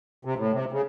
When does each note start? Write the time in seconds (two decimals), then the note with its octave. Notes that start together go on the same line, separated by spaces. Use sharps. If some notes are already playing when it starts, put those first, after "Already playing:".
0.25 C3
0.38 A2
0.52 C3
0.72 C#3